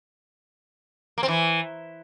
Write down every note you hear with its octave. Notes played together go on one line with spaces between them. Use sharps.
A#3
C4
E3